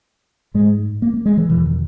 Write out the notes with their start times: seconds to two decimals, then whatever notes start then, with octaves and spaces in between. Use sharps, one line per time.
0.54 G#2 G#3
1.02 A#3
1.14 A#3
1.26 G#3
1.37 E3
1.49 B2 E3
1.52 E2
1.65 D#3